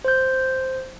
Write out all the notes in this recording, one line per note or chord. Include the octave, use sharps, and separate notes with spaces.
C5 G6